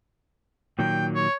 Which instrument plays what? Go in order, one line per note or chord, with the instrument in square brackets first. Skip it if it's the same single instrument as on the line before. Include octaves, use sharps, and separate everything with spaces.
[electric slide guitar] A#2 D#3 F#3 [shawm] G5
[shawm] C#5